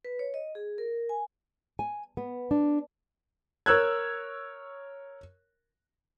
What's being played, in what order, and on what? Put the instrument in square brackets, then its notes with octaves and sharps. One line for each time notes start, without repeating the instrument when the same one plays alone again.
[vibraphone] B4
C#5
D#5
G#4
A#4
G#5
[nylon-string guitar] G#5
B3
D4
[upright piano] A#4 C#5 E6 F#6 G#6